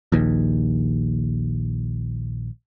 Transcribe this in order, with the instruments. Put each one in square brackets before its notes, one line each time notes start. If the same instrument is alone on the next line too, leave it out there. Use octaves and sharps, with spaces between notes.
[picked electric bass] A#1 D#2